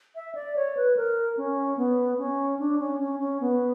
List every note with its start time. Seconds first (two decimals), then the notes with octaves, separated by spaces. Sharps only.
0.15 E5
0.35 D5
0.56 C#5
0.77 B4
0.97 A#4
1.37 C#4
1.77 B3
2.18 C#4
2.59 D4
2.79 C#4
3.00 C#4
3.20 C#4
3.41 B3